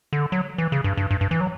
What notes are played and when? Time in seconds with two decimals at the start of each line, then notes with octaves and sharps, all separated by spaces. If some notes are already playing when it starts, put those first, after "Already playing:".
0.13 D3
0.32 F#3
0.58 E3
0.72 C#3
0.84 G2
0.97 G2
1.11 G2
1.21 G2
1.31 E3
1.40 F#3